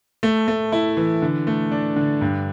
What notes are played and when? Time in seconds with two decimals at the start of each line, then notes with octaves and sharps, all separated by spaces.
0.23 A3
0.48 A3
0.72 E4
0.97 E3
1.22 D3
1.47 A3
1.72 D4
1.96 D3
2.21 G2